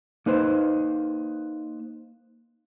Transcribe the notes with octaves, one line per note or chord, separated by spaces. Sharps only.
A#3 D#4 B4 C5